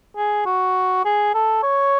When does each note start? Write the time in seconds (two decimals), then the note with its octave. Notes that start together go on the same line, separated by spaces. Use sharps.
0.16 G#4
0.46 F#4
1.05 G#4
1.34 A4
1.63 C#5